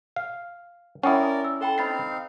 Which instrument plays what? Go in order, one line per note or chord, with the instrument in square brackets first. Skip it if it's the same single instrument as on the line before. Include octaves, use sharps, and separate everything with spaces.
[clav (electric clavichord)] F5
[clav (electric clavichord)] C#4 E4 [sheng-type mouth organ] A#4 D5 [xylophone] F#5 G5 D#6
[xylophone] E6
[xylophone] A4 G5 B5 [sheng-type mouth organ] F#5 A5 C6
[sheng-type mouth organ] C4 D#4 F5 [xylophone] B5 A6 C7